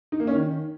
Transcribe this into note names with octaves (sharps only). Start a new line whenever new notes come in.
D#4
A#3
C#4
D#3